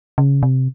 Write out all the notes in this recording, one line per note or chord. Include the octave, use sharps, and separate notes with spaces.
C#3
C3